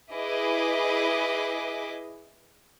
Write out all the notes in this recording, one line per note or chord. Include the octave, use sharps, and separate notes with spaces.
E4 G#4 B4 D#5 D6